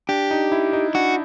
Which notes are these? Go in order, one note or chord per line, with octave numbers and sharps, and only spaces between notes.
D4 G4
D#4
E4
D#4
D4 F#4